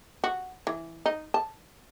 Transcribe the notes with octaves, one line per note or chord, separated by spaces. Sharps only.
F#4
E3
D#4
A5